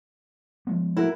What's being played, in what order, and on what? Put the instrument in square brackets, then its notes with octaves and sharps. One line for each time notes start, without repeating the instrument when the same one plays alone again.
[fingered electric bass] F3 G#3 B3
[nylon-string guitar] E4 F#4 A#4